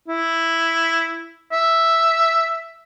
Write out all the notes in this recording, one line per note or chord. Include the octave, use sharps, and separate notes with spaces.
E4
E5